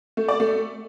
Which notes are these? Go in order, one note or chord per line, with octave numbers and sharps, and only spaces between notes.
A3
D5
A3